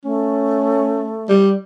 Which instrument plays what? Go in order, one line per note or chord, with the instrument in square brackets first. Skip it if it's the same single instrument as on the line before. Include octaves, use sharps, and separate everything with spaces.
[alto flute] A3 [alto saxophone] C#4
[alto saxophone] G3